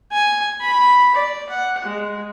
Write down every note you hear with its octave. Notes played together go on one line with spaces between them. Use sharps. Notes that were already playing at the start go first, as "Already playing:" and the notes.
G#5
B5
D5
F#5
G#3